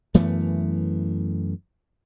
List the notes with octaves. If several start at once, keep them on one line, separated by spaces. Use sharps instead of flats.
F#2 E3 A3 B3